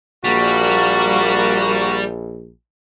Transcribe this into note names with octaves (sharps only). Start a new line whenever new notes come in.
A#1 G3 A#3 F#4